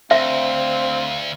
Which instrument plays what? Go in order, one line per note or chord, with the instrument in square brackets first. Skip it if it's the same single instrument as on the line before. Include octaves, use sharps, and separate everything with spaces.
[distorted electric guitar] D2 [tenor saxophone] C4 [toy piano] E5 [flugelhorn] F5